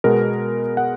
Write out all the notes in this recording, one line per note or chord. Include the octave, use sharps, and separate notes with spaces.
B2 G#3 B3 A#4
F#5